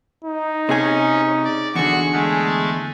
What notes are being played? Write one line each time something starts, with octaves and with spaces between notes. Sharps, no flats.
D#4
C3 C#4 G#4 G#5
D5
E2 D3 F#4 G#4 C#6
G#3 A3